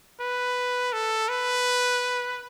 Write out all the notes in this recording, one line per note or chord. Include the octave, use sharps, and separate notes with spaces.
B4
A4
B4